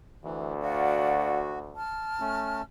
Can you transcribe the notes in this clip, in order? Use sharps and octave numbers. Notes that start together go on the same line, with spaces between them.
D2 E3
F#4 D5 F5 F#5
A5 F6
A3 C#4